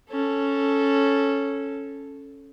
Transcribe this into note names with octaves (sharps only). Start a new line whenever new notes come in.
C#4 A4